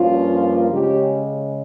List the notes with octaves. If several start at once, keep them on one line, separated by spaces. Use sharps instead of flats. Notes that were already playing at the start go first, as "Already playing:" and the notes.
Already playing: G2 F3 A#3 C#4 F4
C#3 G#3 C#4 G4